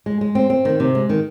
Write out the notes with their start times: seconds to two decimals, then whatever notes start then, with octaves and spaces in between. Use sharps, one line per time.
0.06 G#3
0.21 G#3
0.35 C4
0.50 C4
0.65 D#3
0.80 C3
0.95 G#3
1.09 D#3